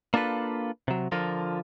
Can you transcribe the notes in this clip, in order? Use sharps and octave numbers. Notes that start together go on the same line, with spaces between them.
A#3 D4 F4 A4 B4
C3 F#3
D3 F3 F4 A#4